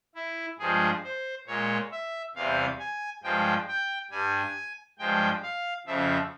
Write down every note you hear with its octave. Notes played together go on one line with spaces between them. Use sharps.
E4
G2 F3 G#3 G#4
C5
A#2 G#3 C#5
E5
E2 C3 G3 F5
G#5
G2 F3 G#3 G5
G5
G2 G3 G#5
G2 F3 G#3 G5
F5
F2 C#3 F3 E5